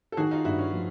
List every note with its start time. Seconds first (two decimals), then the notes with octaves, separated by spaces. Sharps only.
0.12 A4
0.17 D#3 F#4 G#4
0.31 D#4 F4
0.45 G2 E4 F#4
0.58 C#4
0.72 F3